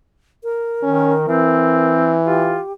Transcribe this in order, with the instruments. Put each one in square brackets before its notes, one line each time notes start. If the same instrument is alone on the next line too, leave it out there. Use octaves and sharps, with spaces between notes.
[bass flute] A#4
[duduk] D#3 [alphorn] C#4
[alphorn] E3 [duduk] C4
[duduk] F4 [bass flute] G4